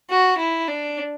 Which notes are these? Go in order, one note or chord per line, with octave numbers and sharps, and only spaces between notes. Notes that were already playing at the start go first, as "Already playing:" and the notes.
F#4
E4
D4